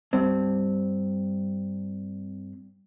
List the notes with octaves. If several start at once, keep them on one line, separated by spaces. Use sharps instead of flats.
G2 C4